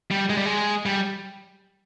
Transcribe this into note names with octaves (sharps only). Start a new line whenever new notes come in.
G3
G#3
G3
G#3
G3